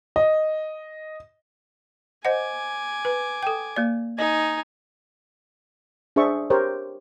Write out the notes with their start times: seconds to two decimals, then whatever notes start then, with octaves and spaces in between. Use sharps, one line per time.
0.16 D#5
2.25 C5 D#5 F#5 G#5 D6
3.05 B4
3.43 A4 G5
3.76 A#3 D5
4.19 D#4 D#5 G#5
6.16 D4 G#4 C5 E5 C#6
6.50 G4 A#4 C5 C#5